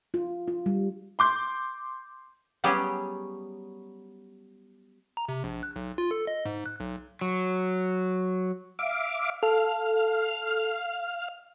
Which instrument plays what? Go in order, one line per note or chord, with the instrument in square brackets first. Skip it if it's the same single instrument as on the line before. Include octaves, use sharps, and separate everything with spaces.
[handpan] F4
F4
G3
[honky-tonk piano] C6 D6 G6
[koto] F#3 G3 B3 C#4 G4 G#4
[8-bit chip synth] A#5
C3
A#1
F#6
B1
F4
A4
D#5
G#2
F#6
B1
[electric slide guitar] F#3
[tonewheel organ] E5 F5 D6
[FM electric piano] A4 [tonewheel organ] F5 F6